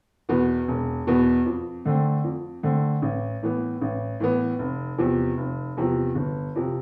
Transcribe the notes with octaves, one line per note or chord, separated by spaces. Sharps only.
E2 B2 B3
E1
E2 B2 B3
F2
D3 A3 C4
F2
D3 A3 C4
A1
A2 E3 B3
A1
A2 E3 B3
F1
E2 C3 F3
F1
E2 C3 F3
G1
F2 C3